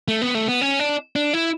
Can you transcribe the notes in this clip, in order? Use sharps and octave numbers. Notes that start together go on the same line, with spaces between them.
A3
B3
A3
B3
C#4
D4
D4
E4